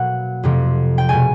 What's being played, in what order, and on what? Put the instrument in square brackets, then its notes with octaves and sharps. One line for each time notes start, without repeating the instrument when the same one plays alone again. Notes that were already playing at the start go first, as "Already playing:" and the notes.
Already playing: [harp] B2 F#3 A#3 F#5
F2 C3 F3 A3
G5
B2 G#3 G#5